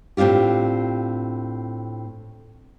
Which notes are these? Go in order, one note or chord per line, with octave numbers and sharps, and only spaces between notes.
A2 C4 D4 F4 G4